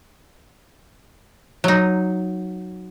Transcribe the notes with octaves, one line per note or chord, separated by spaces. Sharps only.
F#3 D#4